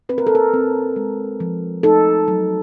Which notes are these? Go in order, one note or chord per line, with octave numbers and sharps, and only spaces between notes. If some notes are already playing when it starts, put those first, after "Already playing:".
C4 B4
A#4
A4
A#4
C4
G#3
F3
D#4 A4
F#3